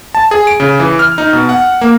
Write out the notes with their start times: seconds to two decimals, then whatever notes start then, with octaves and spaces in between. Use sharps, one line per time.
0.15 A5
0.31 G#4
0.47 D7
0.60 C#3
0.79 E3
0.99 F6
1.18 D#4
1.33 B2
1.49 F#5
1.81 A#3